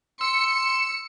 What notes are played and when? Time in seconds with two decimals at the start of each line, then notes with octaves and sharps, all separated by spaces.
0.21 C6 E6 C#7